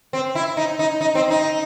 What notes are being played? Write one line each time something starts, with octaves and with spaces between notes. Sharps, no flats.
C4
E4
D#4
D#4
D#4
C4
D#4